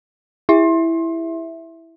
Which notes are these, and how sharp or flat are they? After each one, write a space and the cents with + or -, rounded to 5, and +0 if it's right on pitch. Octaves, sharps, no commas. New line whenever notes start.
E4 +0 E5 +0